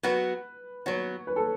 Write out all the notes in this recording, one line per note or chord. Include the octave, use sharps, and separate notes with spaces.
F#3 B3 F#4 B4
F#3 B3 F#4 C#5
B4
A4